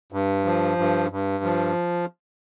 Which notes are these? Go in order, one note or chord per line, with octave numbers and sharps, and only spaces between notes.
G2
F3
G2
G2
F3